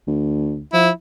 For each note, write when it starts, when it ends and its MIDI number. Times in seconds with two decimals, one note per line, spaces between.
0.07 0.61 38
0.73 0.90 53
0.73 0.90 64